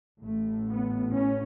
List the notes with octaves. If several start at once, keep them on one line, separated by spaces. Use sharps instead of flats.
A1 A2 A3
B3
C#4